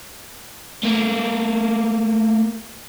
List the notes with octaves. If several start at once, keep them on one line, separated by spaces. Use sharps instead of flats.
A3 A#3